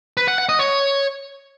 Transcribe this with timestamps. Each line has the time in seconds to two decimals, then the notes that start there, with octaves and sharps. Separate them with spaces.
0.17 B4
0.28 F#5
0.38 F#5
0.49 D#5
0.59 C#5